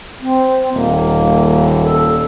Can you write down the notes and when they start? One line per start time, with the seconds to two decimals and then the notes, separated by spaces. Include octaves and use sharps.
0.21 C4
0.74 D#1 A#3
1.82 A4